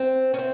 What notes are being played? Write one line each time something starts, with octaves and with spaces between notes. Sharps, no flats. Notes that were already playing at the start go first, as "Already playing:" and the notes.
Already playing: C4
C#4
C4